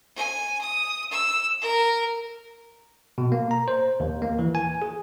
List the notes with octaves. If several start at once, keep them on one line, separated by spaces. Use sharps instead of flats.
G#5
D#6
E6
A#4
B2
A#3
A#5
C5
D#2
A#3
E3
G#5
G#4